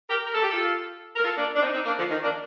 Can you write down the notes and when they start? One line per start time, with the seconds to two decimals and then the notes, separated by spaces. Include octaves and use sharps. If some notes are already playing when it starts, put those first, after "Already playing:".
0.10 G4 A#4
0.26 A#4
0.34 A4
0.42 G4
0.51 F4 A4
1.16 A#4
1.24 F4 A4
1.37 A#3 D4
1.55 D4
1.62 C4 D#4
1.74 C4 D#4
1.86 A#3 D4
1.98 D3 F3
2.11 D#3
2.23 A#3 D4